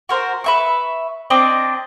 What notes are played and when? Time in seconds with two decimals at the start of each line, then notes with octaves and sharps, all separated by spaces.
0.09 F#4 A#4 C5
0.44 B4 E5 C#6
1.30 C4 D4 D5 D#5